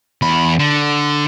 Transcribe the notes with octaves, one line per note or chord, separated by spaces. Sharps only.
E2 B5
D3